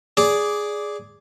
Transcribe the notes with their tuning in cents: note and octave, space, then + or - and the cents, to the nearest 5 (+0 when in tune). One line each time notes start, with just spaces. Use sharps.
G#4 +0 D5 -10